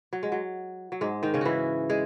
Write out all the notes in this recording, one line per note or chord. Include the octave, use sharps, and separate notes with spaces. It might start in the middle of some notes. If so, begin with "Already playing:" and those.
F#3
G#3
F#3
F#3
G#2 G#3
D#3 D#4
C#3 C#4
E3 E4 F#4
G#3 G#4